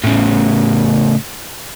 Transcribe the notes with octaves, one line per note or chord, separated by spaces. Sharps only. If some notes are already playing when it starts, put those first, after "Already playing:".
A2 C#3